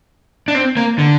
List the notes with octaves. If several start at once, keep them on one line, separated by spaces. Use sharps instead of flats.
D4
C4
A#3
D3